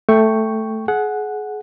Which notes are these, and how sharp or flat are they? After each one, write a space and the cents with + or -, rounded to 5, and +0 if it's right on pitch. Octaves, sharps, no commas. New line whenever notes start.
A3 +0 G5 +0 C#6 +0
G#4 +30 F#5 -5